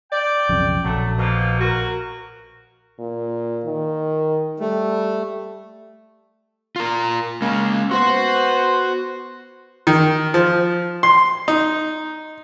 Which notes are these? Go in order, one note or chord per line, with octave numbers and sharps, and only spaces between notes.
D5 G5
B1 F2 C#3
A#1 F#3 A3
B2 F3 A#3
F#4 A#4
A#2
D#3
G3 A3
F4 A#4
G#3 A#3 C#4
B3 F#4 C5 F#5 C6
D#3
F3
C6
D#4